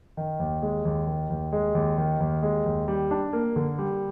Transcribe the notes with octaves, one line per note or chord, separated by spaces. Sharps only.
D#3
D#2
G#3
D#2
D#3
D#2
G#3
D#2
D#3
D#2
G#3
D#2
G3
D4
A#3
D3
G3